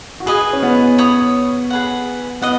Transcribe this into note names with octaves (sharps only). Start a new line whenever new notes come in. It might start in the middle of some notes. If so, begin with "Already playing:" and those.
F#4
G#4 B4 D#5 G#5
C#4
B3
C#5 B5 D#6
G#4 B4 F#5
B3 D#5 F#5